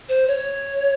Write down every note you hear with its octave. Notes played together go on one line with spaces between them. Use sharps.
C5
C#5